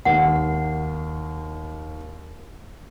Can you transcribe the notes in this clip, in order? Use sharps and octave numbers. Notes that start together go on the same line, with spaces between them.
D#2 D#3 F#5